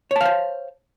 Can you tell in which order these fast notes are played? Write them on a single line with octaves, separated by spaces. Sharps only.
C#5 A5 F5 C5